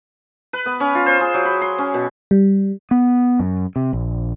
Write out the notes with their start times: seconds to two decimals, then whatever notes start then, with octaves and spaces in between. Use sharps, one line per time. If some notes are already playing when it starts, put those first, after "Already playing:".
0.53 B4
0.66 B3
0.80 C#4
0.95 F4
1.06 C5
1.20 G#4
1.34 F#3
1.45 B5
1.62 C6
1.79 C#4
1.94 B2
2.31 G3
2.91 B3
3.39 F#2
3.76 C3
3.93 A#1